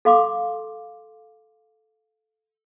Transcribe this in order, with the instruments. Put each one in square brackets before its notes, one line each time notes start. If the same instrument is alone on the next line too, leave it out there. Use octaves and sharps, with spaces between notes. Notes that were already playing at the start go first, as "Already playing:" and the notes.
[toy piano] A4 F5 C6 D6